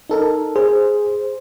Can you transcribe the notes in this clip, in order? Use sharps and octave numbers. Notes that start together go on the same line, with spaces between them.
D#4 A4 A#4
G#4 C5